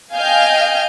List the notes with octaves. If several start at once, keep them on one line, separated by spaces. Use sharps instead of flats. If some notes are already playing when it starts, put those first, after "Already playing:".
D#5 F5 G5 G#5 F6 G6